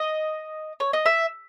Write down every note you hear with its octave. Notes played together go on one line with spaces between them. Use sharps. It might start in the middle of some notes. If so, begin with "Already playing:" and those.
Already playing: D#5
C#5
D#5
E5